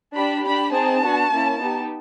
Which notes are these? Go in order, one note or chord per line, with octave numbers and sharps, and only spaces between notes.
D4 G4 B5
D4 G4 B5
C4 D#4 G#4 A5
B3 D4 F#4
A#3 C#4 E4
B3 D#4 G4